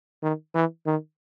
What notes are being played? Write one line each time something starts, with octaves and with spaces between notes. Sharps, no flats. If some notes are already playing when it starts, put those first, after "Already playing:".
D#3
E3
D#3